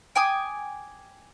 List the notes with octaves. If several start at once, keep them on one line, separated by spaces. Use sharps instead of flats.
G5 G#5 D6 D#6